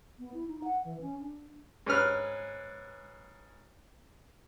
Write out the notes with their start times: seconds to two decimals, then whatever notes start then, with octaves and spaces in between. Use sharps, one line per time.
0.19 B3
0.34 E4
0.48 D#4
0.64 F#5
0.84 E3
1.01 C#4
1.20 D4
1.86 G#2 C#4 B4 F6